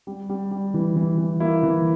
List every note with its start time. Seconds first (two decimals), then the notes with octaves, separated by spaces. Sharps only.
0.07 G3
0.29 G3
0.51 G3
0.74 E3
0.96 E3
1.18 E3
1.40 A#3 E4
1.63 E3